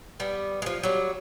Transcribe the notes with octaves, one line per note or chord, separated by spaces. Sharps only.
G3 B3
F3 G#3
F#3 G3